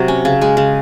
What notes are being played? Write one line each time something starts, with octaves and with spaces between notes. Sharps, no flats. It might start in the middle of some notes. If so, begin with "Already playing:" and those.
Already playing: C3 F#3
C#4
C#3
G#3
C#3